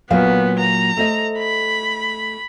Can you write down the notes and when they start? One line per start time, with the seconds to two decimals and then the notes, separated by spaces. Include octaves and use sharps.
0.10 A#2 F#3 B3 F5
0.59 A#5
0.97 A3 C5 D#5
1.38 B5